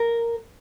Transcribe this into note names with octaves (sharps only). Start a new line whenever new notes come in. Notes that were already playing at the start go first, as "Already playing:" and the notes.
Already playing: A#4